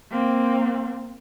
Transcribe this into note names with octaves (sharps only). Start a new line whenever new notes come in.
A#3 C4